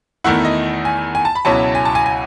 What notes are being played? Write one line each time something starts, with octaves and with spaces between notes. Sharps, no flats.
E2 D#3 A3 E4 F#5
D#5
G#5
G#5
A5
B5
C#2 B2 F#3 C#4 E4 A5
G#5
A5
G#5
G#5